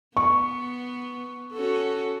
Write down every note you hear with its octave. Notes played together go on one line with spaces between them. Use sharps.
B3 C#6
C#4 F#4 A4